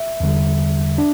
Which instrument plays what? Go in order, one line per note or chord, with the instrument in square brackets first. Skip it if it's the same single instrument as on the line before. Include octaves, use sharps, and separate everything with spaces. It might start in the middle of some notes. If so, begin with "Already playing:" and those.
Already playing: [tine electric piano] E5
E2 D3 G3
D4